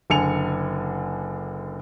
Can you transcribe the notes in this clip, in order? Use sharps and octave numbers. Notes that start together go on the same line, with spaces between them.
F#1 D3 G#5 C#7 F7